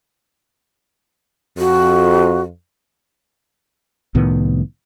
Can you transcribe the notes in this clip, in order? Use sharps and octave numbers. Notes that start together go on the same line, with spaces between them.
F2 F#4
C2 A2 D#3 B3